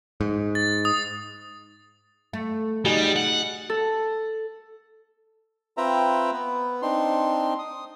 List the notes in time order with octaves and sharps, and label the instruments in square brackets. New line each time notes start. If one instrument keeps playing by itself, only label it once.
[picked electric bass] G#2
[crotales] A6
D#6
[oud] A3
[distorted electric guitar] G3 [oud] D#4 F#4 G#4
[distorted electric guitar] F#5
[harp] A4
[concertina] C4 F4 B4 E5 G5 A#5
B3 B4
C4 D4 D#4 C6
D#6